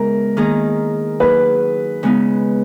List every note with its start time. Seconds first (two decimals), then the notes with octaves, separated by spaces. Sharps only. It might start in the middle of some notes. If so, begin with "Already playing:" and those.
Already playing: C#3 G#3 B3 E4 A#4
0.37 D#3 A#3 C#4 G#4 D#5
1.20 F#3 A#3 D#4 G#4 B4
2.03 C#3 G#3 B3 D#4